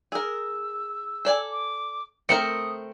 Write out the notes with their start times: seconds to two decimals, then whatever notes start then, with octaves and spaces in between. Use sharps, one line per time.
0.12 G#4 A#4 E6
1.25 A4 D5 G#5
1.51 D6
2.29 A3 C4 A#4 D#6 C#7